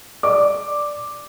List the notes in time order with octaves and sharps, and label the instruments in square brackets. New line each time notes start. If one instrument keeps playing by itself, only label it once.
[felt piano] D5 D6